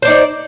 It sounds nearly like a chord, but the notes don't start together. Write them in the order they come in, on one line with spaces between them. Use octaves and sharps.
C5 D4 D#4 D5